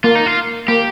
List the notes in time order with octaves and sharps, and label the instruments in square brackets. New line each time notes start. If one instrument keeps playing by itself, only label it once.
[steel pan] A#3 [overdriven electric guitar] F4
[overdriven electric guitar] D#4
F4
[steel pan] A#3 [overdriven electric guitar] G4